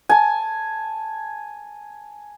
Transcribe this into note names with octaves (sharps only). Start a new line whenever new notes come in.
G#5 A5